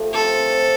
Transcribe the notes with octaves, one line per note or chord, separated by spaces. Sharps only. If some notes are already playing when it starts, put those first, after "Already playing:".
Already playing: F3 A3 G4
C4 A4
C4